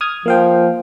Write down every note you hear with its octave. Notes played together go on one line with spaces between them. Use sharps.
D#6 F6 G#6
F3 A#3 F5 G5